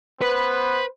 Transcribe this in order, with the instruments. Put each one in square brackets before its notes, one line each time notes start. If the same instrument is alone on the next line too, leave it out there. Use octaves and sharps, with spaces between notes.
[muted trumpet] B3 [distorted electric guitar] B4 [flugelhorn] C5